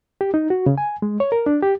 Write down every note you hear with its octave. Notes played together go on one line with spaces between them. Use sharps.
G4
D#4
F#4
C#3
G#5
G#3
C#5
A#4
D4
G4